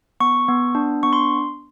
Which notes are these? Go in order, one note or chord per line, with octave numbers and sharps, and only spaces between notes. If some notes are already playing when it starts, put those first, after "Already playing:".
B3 C#6
B3
D4
B3 C#6
C6